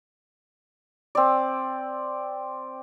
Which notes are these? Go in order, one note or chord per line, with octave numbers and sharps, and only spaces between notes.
C4 D5